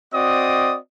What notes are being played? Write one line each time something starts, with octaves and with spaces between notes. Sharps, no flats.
C4 F#4 D5 D#5 D#6